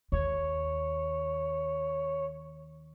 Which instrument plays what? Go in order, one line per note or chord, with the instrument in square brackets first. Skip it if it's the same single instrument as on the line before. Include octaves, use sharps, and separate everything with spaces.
[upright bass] D#2 [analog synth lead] C#5